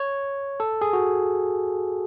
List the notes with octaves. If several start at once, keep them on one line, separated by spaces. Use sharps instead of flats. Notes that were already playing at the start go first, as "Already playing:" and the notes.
Already playing: C#5
A4
G#4
F#4